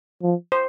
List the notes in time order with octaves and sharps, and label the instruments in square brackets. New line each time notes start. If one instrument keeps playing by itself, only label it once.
[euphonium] F3
[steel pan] C5